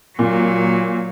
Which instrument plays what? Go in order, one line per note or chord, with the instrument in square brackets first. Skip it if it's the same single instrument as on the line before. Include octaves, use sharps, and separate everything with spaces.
[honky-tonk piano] A#2 [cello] F#3